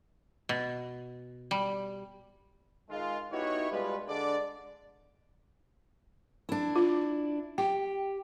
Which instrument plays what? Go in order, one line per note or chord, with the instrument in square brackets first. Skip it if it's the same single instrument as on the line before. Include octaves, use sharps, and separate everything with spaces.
[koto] B2
G3
[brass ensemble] D#3 G#3 F4
B3 D#4 E4 F#4 G4 C#5
B2 G3 G#3 B3 F4 B4
D3 G#3 D4 D5
[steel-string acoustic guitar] D4 E4
[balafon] F4
[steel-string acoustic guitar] G4 [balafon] G5